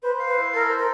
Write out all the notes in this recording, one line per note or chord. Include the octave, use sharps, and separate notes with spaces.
B4 C5
F5
B4
E4
A4 A#4
C5
A#4